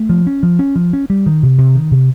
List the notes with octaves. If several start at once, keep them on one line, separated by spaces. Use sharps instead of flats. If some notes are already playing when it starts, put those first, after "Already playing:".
Already playing: A3
F3
C#4
F3
C#4
F3
C#4
G3
D#3
C3
C3
D#3
C3